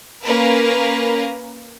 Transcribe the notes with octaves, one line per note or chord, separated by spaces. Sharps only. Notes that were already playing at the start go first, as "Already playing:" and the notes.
A#3 C#4 A#4 B4